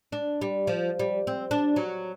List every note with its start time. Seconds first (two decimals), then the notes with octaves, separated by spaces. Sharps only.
0.12 D4
0.42 G3
0.67 F3
0.99 G3
1.27 C4
1.51 D4
1.76 F#3